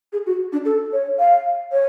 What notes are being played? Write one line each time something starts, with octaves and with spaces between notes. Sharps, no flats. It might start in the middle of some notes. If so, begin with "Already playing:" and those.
G#4
F#4
D4
A4
C#5
F5
C#5